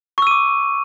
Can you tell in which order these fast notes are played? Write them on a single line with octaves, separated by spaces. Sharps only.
C#6 E6 D#7 D6